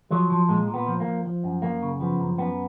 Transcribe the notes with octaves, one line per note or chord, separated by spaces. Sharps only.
F3 F#3
F3
A#2 G#3
A#2
B3
F3
A#3
F3
F3
F#2
F#2 A#3
C#3
F3 B3
F#2
F#2 B3